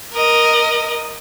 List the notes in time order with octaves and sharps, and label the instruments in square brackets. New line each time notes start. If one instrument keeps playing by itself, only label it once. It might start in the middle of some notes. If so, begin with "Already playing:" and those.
[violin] A#4 D#5